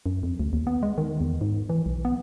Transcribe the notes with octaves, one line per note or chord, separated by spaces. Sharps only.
F#2
F2
D2
D#2
B3
G#3
D#3
E2
G#2
E3
B1
B3